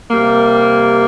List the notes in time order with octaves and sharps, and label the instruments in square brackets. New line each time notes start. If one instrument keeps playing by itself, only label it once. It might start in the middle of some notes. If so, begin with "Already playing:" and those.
[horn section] C3 G3 A#3